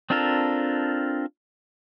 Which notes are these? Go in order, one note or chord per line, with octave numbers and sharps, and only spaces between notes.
C4 D4 F4 A4 A#4